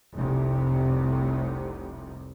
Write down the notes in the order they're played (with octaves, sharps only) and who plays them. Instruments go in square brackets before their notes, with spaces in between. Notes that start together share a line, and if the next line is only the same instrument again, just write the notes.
[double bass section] F1 C2 C3